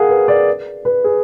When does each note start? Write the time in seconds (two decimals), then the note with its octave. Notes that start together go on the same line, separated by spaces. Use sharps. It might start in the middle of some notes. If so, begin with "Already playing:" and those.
Already playing: G#4 A#4 F5 F#5
0.09 B4
0.28 D5
0.85 B4
1.04 G#4